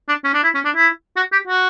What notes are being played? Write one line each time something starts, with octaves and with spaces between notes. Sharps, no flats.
D4
C#4
D4
E4
C#4
D4
E4
F#4
G4
F#4